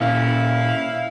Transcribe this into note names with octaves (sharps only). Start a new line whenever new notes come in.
A#2 C#4 E4 E5 F5